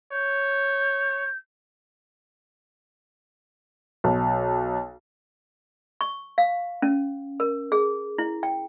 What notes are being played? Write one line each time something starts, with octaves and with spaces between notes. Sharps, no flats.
C#5 G6
B1
C#6
F5
C#4
A#4
G#4
E4
G5